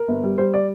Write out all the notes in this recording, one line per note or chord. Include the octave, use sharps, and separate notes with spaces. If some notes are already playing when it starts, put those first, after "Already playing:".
Already playing: A#4
G1
G3
G3 C5
D5